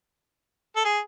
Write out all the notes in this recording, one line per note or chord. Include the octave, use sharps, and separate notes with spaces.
A4
G#4